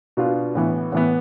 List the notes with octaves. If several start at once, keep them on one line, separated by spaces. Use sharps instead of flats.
B2 B3 D4 F4
A2 E3 B3
A2 E3 B3